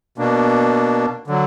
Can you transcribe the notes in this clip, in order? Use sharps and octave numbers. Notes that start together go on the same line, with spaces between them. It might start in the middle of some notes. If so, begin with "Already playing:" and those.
B2 A#3 D4
D3 F#3